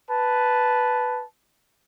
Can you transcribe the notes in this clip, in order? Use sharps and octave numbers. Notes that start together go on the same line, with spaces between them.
B4 A5